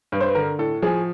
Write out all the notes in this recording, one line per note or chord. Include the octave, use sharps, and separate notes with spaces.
G2 B4
C5
B4
D3 A#4
A2 A4
F3 G#4